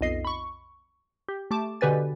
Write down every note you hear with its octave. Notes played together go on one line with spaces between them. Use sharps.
B1 F2 D#5 C7
B5 C#6
G4
A3 G4 A5 D6
B2 D3 G4 B4 G#5 A6